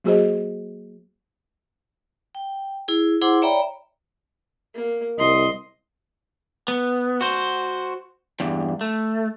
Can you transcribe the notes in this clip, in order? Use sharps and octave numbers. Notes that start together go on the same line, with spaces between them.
F#3 A#3 F#4 G#4 C5 D#5
G5
E4 G#4
E4 G#4 C5 F#5 C6 D6
C#5 D5 E5 G5 A#5 B5
A#3
C2 D#5 C6
B3
F#4 C5
E2 G2
A3